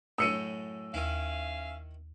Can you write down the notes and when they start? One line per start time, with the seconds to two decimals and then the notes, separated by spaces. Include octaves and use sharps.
0.18 F#2 A2 E6 C#7 D#7
0.94 D#2 D#3 C#4 E4 E5 F5